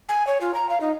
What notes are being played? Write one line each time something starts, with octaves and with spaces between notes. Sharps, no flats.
G#5
C#5
F4
A#5
F5
D#4